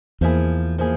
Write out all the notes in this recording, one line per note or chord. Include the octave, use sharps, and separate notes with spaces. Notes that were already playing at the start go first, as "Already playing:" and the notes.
E2 F3 A#3 E4 G#4
F3 A#3 E4 G#4